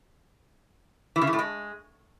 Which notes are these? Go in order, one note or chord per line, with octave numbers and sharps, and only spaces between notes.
E3
C#3
E3
A2
G#3